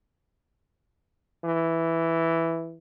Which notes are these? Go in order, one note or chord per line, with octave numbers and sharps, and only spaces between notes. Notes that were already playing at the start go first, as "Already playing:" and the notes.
E3